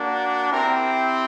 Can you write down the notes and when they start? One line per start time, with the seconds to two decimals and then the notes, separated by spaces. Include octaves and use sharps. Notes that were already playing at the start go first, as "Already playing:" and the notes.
Already playing: A#3 D4 F#4
0.52 C4 E4 G4 A#4